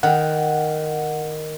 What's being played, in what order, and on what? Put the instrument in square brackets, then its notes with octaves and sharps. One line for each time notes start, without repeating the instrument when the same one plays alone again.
[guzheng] D#3 [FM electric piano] F#5